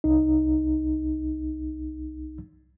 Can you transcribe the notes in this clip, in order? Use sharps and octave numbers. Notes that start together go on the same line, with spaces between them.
C2 D#4